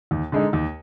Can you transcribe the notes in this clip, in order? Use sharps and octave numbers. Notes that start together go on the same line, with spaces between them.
D#2
D3 G#3 D#4
D#2